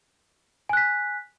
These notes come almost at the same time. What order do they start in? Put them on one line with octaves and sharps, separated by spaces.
G#5 F#6 B6